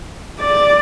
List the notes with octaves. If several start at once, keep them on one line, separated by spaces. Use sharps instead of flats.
D5